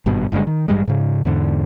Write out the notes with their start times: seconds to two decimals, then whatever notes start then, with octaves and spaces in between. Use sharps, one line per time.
0.06 G#1 G2 B2
0.32 F#1 G2 D3 G#3
0.47 D#3
0.68 A1 G2 G3 G#3
0.87 G#2 C#3
1.25 E2 G#2 D3